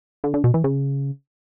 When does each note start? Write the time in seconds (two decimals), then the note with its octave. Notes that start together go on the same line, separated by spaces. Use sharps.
0.24 D3
0.34 D3
0.44 B2
0.54 E3
0.64 C#3